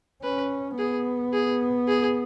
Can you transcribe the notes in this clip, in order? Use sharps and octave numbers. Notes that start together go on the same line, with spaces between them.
C#4 B4
B3 G#4
G#4
G#4